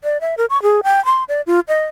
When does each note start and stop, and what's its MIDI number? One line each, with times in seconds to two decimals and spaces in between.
0.04 0.20 74
0.21 0.35 76
0.38 0.46 70
0.50 0.61 85
0.62 0.81 68
0.84 1.04 79
1.05 1.24 84
1.28 1.41 74
1.47 1.60 65
1.68 1.86 75